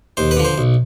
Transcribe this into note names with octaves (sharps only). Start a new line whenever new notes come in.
D#2 C5
B4
D3 F3
C5
B1